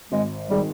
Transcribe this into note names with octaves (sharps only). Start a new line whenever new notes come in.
G#1 G#3
D#3 G3 G#3